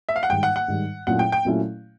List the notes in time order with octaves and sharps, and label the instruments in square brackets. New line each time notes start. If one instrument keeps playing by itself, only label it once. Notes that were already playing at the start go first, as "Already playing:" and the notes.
[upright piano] E5
F5
F#5
[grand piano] G#2 D#3 G3 [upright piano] G5
[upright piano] F#5
F#5
[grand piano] G#2 D#3 G3
[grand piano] A#2 F#3 A3 C#4 E4 [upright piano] F#5
[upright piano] G5
G5
[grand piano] A#2 F#3 A3 C#4 E4